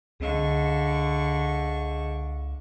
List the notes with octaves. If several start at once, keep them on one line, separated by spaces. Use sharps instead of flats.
C#2 D3 G#4 D#5 F5 C#6